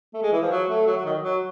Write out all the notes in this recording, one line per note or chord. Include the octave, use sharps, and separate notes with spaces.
A3
G#3
E3
F3
F#3
A3
F#3
F#3
D#3
F#3